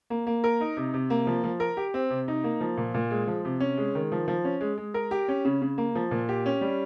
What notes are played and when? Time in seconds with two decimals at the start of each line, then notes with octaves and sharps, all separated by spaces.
0.10 A#3
0.27 A#3
0.44 A#4
0.61 D#4
0.77 C3
0.94 C3
1.10 A#3
1.27 F3
1.44 F3
1.60 A#4
1.77 G4
1.94 C4
2.10 C3
2.28 D#4
2.44 A#3
2.61 F3
2.77 A#2
2.94 A#2
3.11 G#3
3.27 F3
3.45 C3
3.60 C#4
3.78 G#3
3.95 D#3
4.12 F3
4.28 F3
4.44 C#4
4.61 G#3
4.78 G#3
4.94 A#4
5.11 G4
5.28 C#4
5.45 C#3
5.62 C#3
5.78 A#3
5.95 F3
6.11 A#2
6.29 G4
6.46 C#4
6.61 G3